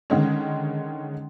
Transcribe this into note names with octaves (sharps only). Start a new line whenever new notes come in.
D3 D#3 G#3 C#4